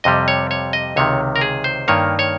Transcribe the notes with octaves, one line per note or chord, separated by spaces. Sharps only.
F2 C3 G3 D#5
C#5
C#5
D#5
C#2 C3 D#3 C#5
A#4
G#4
C5
G2 D#3 A#3 C#5
C#5